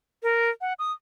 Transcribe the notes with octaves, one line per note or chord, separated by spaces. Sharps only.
A#4
F#5
D#6